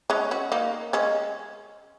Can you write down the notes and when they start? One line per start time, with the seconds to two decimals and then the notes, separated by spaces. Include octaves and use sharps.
0.10 G#3 C#4
0.31 C#4 F#4
0.52 A#3 D#4
0.93 G#3 C#4